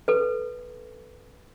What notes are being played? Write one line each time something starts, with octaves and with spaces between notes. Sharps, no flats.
A4 B4